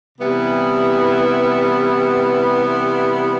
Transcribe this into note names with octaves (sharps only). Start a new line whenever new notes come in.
C3 E3 G3 B3 E4